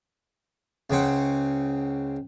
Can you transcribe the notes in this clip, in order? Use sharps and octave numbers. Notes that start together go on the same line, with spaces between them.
C#2 C#3 C4 F#5